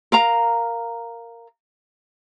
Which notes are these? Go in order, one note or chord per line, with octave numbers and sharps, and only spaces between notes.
A#4 F5 A#5